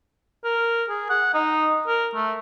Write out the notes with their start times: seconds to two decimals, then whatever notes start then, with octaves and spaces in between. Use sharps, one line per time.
0.44 A#4
0.89 G#4
1.10 F#5
1.34 D#4
1.87 A#4
2.15 A3